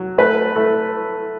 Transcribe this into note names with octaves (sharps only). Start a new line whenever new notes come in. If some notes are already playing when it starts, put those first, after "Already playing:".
Already playing: F#3
A3 B4
A3 A4